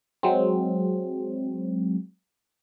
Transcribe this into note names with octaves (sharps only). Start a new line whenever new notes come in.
F#3 G#3 C4